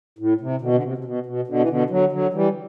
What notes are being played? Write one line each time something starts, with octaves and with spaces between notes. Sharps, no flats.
A2
C3
B2 D3
D3
C3
C3
B2
B2
B2 D3
E3
B2 D3
D3 F#3
D3 F#3
E3 G3